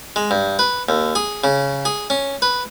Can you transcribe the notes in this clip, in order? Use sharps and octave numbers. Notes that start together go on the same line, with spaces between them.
G#3
G2
B4
D#2
G#4
C#3
G#4
C#4
B4